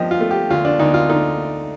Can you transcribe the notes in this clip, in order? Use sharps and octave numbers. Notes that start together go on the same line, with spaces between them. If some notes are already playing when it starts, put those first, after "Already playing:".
Already playing: G2 F3 G4 D#5
F4
A3
G4
D2 F4
D4
D2 D#4
F4
D3 D#4